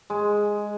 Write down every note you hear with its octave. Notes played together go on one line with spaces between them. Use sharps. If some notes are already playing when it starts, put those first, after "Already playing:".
G#3